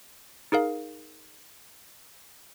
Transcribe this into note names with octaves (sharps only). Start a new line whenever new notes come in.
D#4 G#4 A#4 F5